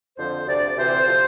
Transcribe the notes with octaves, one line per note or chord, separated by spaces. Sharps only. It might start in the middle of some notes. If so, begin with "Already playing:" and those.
F2 D3 F3 C5
D2 C3 F3 D5
D2 C3 E3 C5
C3 F3